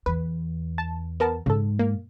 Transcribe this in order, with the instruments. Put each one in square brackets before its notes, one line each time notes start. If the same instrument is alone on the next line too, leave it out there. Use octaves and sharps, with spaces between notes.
[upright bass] E2 [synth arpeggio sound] B4
[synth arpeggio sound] A5
B3 A#4 A5
[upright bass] G#2 [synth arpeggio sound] C#3 A4
[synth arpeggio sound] A#3